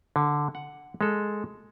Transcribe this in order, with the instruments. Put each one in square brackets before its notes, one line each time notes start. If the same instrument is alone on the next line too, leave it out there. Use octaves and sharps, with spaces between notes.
[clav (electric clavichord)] D3
F#5
G#3 A4